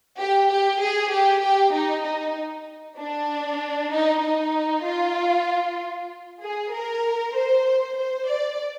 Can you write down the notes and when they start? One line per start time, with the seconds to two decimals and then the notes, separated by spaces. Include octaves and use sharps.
0.20 G4
0.50 G4
0.82 G#4
1.12 G4
1.43 G4
1.75 D#4
2.06 D#4
2.98 D4
3.92 D#4
4.23 D#4
4.86 F4
6.42 G#4
6.72 A#4
7.35 C5
7.96 C5
8.28 D5